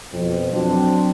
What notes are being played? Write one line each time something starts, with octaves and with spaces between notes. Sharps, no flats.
F2 B2 C4
F#3 C4 D4